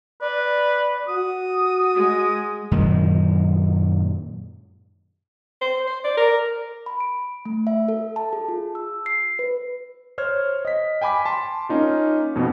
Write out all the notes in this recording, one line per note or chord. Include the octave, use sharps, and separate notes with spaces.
B4 D5
F#4 D#6
G#3
F#2 A#2 D#3 G#3
C5
C5
D5
A#4
B5
D7
A3
E5
A4
A5
G#4
F4
E6
C7
B4
C5 C#5 F6 G#6
D#5 B6
G5 G#5 B5 D6 B6
A5 C6
A#3 C#4 D#4 F4
F2 B2 B3